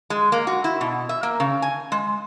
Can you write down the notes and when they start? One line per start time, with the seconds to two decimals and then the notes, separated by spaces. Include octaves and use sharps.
0.10 G#3
0.32 A#3
0.47 F#4
0.64 E4
0.81 B2
1.09 E5
1.23 A#3
1.40 C#3
1.62 G#5
1.92 G#3